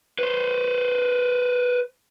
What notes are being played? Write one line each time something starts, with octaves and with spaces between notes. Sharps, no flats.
B4 C5